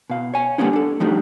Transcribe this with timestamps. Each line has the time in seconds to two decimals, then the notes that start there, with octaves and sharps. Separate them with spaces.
0.10 B2 F5
0.34 C#5 G#5
0.58 D3 G3 A#3 B3 C#4 D#4
0.73 D4 A4
1.00 F3 G3 A3 D4 D#4 F#4